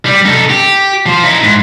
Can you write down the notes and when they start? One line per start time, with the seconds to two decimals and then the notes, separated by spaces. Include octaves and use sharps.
0.06 G3
0.25 D#4 A4
0.50 G4
1.06 F3 C5
1.24 D#4 E4
1.43 G#2